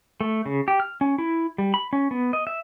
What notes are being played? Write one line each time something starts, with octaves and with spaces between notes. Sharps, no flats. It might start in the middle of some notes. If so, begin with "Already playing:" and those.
A3
C#3
G4
F6
C#4
E4
G3
B5
C#4
B3
D#5
E5